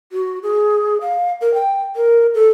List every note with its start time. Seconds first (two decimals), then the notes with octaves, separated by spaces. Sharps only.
0.12 F#4
0.43 G#4
1.01 F5
1.41 A#4
1.54 G5
1.96 A#4
2.34 A4